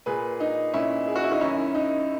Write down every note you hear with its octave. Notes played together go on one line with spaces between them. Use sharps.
A#2 G#4 B4
D#4
A#2 C#4 E4
G#4
F#4
E4
D#4 F#4
F#2 D#3 C#4 E4
D#4